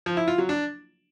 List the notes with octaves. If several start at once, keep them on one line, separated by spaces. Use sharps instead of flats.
F3
E4
F4
F#3
D4